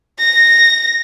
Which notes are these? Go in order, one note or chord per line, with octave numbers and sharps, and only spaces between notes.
A#6